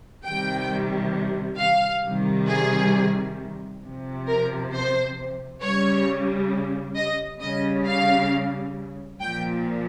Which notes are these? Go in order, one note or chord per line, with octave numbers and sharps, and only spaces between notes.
C3 D#3 G3 G5
F5
C3 D#3 G3
G#4
C3 F3
A#4
C5
C#3 G3 C#5
D#5
C#3 G3 D#5
F5
A#2 F3 G5